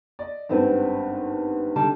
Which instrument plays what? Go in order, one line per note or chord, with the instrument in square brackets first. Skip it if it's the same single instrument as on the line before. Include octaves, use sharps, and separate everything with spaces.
[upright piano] D5 D#5
[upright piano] G#1 G2 [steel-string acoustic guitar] B3 C4 B4
[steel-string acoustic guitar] D3 G3 A5